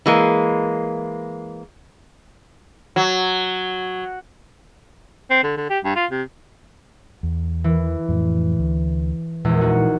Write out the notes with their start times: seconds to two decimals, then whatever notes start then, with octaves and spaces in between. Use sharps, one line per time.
0.06 E3 G#3 A#3
2.96 F#3
5.30 C4
5.43 D3
5.57 D3
5.70 G4
5.84 G2
5.96 F4
6.11 C3
7.23 E2
7.64 E3
8.09 F2 A2
8.59 D2
9.45 A#1 E2 A#2 E3 G#3
9.61 D#4 F#4